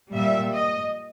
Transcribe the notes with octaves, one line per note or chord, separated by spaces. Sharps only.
A#2 G3 E5
D#5